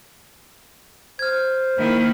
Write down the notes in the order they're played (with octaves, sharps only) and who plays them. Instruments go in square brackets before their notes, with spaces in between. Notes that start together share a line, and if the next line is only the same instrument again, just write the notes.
[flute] C5 [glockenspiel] F6 G#6
[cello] D#3 E4 [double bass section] A#3